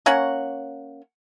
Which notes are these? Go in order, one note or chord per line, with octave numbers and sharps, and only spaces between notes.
A#3 C#4 C#5 F#5